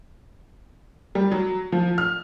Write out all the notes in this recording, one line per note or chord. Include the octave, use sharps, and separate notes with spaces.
G3
F#3
F3
F6